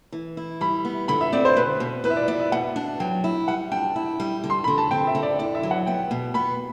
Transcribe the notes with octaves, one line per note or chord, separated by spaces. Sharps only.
E3
E4
G3 B5
B3
D3 B5
E5
C4 D5
C5
B2 B4
B2
E4 B4
E5
D5
B3 D5
E5
B2 F#5
D4
F#3 G5
E4
G3 F#5
D4 G5
E4
G3
D3
C6
D3 B5
A5
C4 G5
E5
D3
D5
E4 D5
E5
F#3
F#5
B3 G5
B2
B3 B5